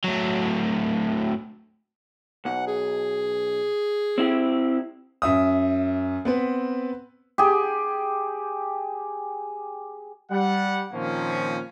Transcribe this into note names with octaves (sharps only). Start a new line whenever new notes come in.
A2 F#3
B1 F#5
G#4
C4 E4 G4
F#2 E5 D#6
B3 C4 B4
G4 G#4
G3 F#5
A#2 D#3 F3 A#3 C4 C#4